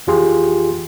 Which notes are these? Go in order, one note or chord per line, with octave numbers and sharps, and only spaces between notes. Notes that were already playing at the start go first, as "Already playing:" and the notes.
F2 E3 F4 G4 G#4 C6